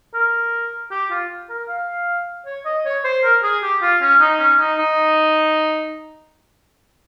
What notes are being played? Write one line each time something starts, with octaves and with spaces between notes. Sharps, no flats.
A#4
G4
F4
A#4
F5
C#5
D#5
C#5
C5
A#4
G#4
G4
F4
C#4
D#4
C#4
D#4
D#4